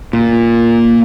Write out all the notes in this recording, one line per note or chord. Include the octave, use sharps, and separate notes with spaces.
A#2